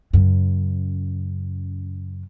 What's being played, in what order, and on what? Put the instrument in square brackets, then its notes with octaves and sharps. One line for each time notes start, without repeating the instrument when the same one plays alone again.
[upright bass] F#2 C#3